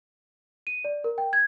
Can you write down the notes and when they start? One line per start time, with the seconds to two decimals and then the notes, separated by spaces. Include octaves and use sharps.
0.67 D#7
0.85 D5
1.04 A#4
1.18 G5
1.33 G#6